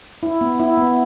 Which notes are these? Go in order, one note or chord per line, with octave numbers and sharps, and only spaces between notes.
E4
B3
E4
B3